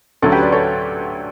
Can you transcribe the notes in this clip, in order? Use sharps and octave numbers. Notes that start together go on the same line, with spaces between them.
D2 D3 F#3 C#4 A4
G4 B4
B4 D5
A4 C#5